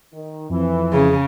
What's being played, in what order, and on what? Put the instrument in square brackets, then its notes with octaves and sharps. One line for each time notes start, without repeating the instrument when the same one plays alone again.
[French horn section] D#3
[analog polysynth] F2 [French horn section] E3
[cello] C#3 [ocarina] G#4